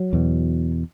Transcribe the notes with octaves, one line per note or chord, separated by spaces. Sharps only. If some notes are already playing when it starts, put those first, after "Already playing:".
Already playing: F#3
E2 B2